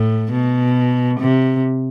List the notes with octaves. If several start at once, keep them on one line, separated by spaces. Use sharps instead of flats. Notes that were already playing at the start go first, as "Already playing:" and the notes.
Already playing: A2
B2
C3